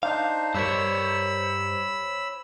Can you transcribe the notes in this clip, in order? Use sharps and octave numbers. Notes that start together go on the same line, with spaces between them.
D4 D#4 C5 F5
G2 G3 A#4 C5 C#5 B5 E6